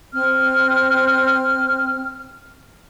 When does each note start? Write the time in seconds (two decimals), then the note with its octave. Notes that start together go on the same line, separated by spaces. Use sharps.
0.14 C4 F6